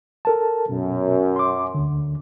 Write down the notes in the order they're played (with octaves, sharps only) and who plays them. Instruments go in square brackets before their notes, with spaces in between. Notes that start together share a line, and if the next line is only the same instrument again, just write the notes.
[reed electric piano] A4 A#4 A5
[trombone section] F#2 [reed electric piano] B2
[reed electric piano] C6 D6
D2 D3